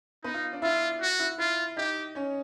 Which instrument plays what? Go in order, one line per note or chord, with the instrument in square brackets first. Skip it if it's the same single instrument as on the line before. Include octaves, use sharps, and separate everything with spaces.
[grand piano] B3 B4 [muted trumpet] D#4
[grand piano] F4 F5
D4 D5
[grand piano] E4 E5 [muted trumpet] F4
[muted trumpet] F#4
[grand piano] E4 E5
[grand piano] E4 E5 [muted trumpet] F4
[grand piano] D#4 D#5 [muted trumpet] G4
[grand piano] C#4 C#5